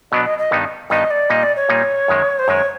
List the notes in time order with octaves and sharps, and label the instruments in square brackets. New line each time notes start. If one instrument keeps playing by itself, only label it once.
[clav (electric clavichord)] B2 F#3 B3 D4 [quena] D#5
[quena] D#5
D#5
[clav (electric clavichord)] G2 D#3 G3 B3 D#4
[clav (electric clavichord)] G2 D#3 G3 B3 D#4 [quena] D#5
[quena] D5
[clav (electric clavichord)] A#2 G3 A#3 D#4 [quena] D#5
[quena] D5
C#5
[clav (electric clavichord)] A#2 G3 A#3 D#4
F#2 D#3 G#3
[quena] C5
[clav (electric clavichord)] F#2 D#3 G#3 [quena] C#5